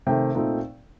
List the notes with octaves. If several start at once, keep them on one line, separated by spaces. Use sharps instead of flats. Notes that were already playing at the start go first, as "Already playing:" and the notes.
C3 D#3 A3 G5
A#2 A3 C4 D#4